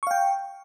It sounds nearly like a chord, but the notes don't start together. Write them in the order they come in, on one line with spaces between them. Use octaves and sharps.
C#6 F5 G5